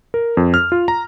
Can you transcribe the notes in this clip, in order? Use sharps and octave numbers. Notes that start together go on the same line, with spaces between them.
A#4
F2
F6
F4
A#5